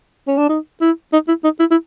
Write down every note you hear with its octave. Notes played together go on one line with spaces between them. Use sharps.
C#4
D4
D#4
E4
D#4
E4
D#4
E4
E4